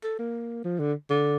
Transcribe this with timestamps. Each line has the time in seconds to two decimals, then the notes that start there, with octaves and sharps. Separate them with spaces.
0.03 A4
0.19 A#3
0.64 F3
0.79 D3
1.10 D3